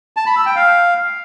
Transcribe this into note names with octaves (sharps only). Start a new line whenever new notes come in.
A5
B5
E6
G5
F5